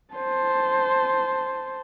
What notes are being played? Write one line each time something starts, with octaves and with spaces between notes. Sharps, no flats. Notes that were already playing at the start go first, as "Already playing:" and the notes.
C5 A5